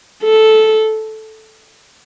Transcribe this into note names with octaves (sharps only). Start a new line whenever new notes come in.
A4